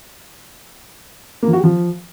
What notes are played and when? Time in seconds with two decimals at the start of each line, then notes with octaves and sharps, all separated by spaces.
1.43 A#3
1.48 F3
1.53 F#4
1.58 G4
1.64 F3